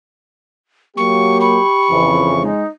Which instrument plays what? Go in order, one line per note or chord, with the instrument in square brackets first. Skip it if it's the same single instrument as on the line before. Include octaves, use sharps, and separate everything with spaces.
[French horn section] F#3 A#3 [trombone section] G4 [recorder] C#6
[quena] B5 [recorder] C#6
[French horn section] F2 C#3 E3
[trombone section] G#3 [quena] D#4